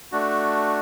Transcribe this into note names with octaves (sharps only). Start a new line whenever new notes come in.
A3 D4 F#4